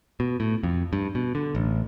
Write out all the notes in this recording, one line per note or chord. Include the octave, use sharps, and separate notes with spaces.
B2
A2
F2
G2
B2
D3
A1